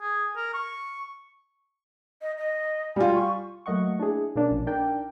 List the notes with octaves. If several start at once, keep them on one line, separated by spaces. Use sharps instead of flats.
G#4
A#4
C#6
D#5
D#5
G3 F4 G#5
C#6
F#3 A3 A#3 D#5 F#5 C#6
D4 E4 G#4
B2 A#3 C#4 D4
A#1
D4 D#4 A#4 D5 G5